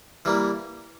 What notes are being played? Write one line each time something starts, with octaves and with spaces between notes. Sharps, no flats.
E3 G3 A#3